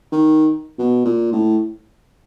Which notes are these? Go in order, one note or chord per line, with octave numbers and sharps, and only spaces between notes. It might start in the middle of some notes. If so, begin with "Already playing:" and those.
D#3
B2
A#2
A2